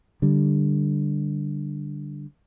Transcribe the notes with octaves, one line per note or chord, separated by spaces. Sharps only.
D3 G3